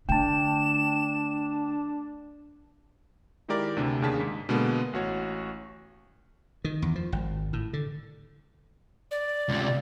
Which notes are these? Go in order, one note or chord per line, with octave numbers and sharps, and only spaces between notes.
D3 A3 D4 G5 A5 E7
D#3 G#3 E4 G4 A#4 D5
D2 C3 D4
D#2 C#3 D4 G#4 A5 B6
G#2
B2 D3 G#3 A#3 B3
A1 F#4 C#5
D#3
E2
F3
G#1
A2
D3
D5
C#2 C3